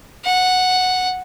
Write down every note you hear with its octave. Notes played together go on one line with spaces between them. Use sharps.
F#5